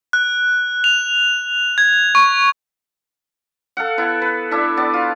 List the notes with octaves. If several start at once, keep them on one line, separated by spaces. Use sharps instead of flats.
F#6
F7
G#6
C#6
A4 F5 F#5
B3 E4
B4
D4 E4 A4 E5
B3 D5
F4